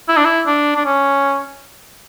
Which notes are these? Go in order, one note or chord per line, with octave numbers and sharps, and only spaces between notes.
E4
D4
E4
D4
D4
C#4